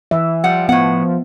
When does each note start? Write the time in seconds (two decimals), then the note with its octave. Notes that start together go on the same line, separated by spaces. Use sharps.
0.11 E3 E5
0.44 F3 G3 F#5
0.69 A2 B3 F#5